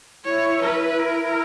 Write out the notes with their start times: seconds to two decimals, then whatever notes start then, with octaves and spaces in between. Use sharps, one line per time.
0.25 E4 C#5
0.62 B4
0.99 A#4